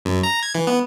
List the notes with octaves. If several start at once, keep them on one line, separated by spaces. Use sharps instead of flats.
F#2
A#5
G#6
E3
B3